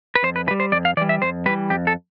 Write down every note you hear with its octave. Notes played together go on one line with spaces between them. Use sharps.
B4
F2 C5
B4
E3 B4
G3
C5
F2 D5
F5
E3 G3 D5
E5
F2 C5
E3 G3 B4
F2 G4
A4